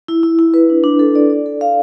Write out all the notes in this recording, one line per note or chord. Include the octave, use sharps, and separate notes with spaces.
E4
E4
E4
B4
D4
D4
A4
D5
D5
A4
F5